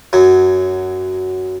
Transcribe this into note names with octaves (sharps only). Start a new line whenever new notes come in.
F#2 F#3